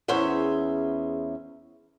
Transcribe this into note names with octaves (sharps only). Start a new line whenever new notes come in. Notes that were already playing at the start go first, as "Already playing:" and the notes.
E2 B3 C#4 G#4 C5 E5